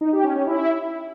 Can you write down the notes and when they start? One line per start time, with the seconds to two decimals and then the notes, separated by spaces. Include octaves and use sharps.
0.01 D#4
0.12 G4
0.24 C#4
0.35 C#4
0.47 E4